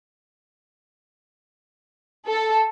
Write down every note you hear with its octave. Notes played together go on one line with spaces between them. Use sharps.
A4